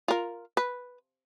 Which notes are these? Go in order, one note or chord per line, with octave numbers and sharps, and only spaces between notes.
F4 A#4
B4